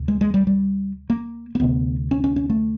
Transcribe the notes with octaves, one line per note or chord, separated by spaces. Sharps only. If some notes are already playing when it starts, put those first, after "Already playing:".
Already playing: D2 C3
G#3
G#3
G3
G3
A#3
A#3
D2 C3 B3
C#4
C#4
C#4
A3